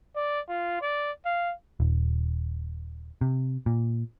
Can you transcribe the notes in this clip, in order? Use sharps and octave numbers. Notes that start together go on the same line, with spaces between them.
D5
F4
D5
F5
D#1
C3
A#2